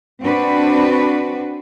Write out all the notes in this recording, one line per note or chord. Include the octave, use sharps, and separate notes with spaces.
C4 D4 F#4 B4